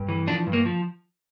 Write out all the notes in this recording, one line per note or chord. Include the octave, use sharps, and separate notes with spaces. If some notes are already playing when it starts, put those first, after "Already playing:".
Already playing: G2
E3
F3 D4
G2
A#3
F3